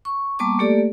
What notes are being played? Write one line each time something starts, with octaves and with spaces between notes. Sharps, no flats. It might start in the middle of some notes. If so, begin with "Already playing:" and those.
C#6
G3 A#3 B3 A5 C#6 D6
A3 A#3 G4 A4 D5